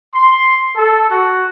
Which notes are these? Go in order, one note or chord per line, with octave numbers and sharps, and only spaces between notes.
C6
A4
F#4